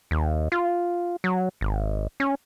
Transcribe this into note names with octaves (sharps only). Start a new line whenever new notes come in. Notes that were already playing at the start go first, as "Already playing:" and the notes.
D#2
F4
F#3
G#1
C#4